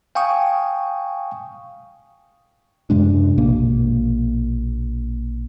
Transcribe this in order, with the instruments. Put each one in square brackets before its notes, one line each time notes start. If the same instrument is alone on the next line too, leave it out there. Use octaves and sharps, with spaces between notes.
[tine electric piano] F5 G5 G#5 C#6 D#6
[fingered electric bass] F#2 C3 G#3 D4
A#1 B2 A#3